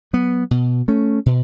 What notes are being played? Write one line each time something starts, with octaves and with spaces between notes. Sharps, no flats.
F#3 B3
B2
A3 C#4
B2